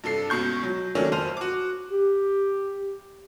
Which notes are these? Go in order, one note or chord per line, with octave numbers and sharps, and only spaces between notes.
G2 C3 A4 C7
C#2 B2 C#6 G6
F#3
D#3 F#3 A3 A#3 C#4 D4
F2 C5 F6 D#7 F7
F#4 D6
G4